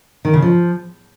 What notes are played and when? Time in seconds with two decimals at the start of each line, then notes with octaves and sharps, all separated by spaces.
0.25 D#3
0.34 C#3
0.42 F3